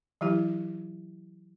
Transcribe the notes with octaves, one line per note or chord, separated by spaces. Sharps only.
E3 F#3 E4 G4